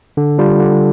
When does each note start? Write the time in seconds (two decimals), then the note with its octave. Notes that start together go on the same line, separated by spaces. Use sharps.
0.17 D3
0.38 G3 D4 F4
0.60 D3